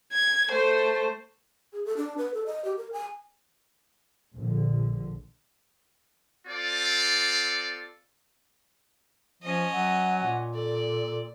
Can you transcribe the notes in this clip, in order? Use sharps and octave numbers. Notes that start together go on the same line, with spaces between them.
G#6
A3 C5
G#4
A4
D4
B4
A4
D#5
G4
A#4
G#5
A#1 D3
C4 F4 A4 D5
F3 C#4 D#5
F#3 F#5
A#2
A4 D5